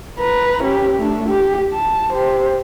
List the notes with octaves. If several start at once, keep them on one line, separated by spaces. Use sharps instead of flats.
B4 A#5
C#4 G4
A3 D4
G4
A5
G4 C5